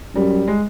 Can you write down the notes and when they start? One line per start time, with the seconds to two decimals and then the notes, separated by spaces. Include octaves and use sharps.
0.15 F#2 G3
0.48 G#3